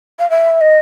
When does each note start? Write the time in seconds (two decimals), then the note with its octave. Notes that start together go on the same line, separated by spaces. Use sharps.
0.19 F5
0.30 E5
0.61 D#5